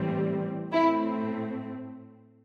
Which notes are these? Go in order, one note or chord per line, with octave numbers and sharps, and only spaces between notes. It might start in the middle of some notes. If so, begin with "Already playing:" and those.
Already playing: A2 E3 G3 C4
A2 A3 C4 E4